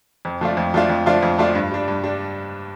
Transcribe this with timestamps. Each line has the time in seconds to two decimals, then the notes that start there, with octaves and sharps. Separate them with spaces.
0.25 F2
0.41 F3 A3 D4 F4
0.57 F2
0.74 F3 A3 D4 F4
0.89 F2
1.06 F3 A3 D4 F4
1.23 F2
1.38 F3 A3 D4 F4
1.55 G2
1.71 G3 D4
1.88 G2
2.03 G3 D4